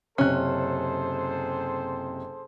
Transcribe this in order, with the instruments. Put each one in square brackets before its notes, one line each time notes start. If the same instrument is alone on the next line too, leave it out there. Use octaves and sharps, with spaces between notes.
[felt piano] F#1 C3 F#6 [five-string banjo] C#4 [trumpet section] G#4 A4 C5